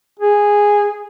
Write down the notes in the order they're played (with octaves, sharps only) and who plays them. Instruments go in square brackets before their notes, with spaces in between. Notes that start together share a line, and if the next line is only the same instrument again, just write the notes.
[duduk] G#4